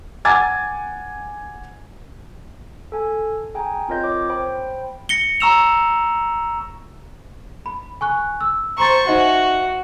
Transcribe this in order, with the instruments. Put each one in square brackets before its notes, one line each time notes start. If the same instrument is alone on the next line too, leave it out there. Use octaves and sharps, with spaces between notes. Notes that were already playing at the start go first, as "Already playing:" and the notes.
[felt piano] F#5 G#5 D6 G#6 A6
[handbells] A4 G#5
G#4 G5 G#5 A#5
C4 F4 A#4 C#5 D#5 G6
C#5 D6
C5 G5 B5
[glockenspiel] A#6 C#7 G7
A#5 C#6 E6 E7 F7
[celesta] B5
G#5 C#6 F#6
E6
[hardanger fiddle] C5 C#6 [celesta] A#5 C6 A6
[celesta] D#4 D#5 E5 [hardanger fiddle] F#4